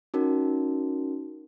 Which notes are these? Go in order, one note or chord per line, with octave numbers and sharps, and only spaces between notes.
C#4 D#4 F#4 A#4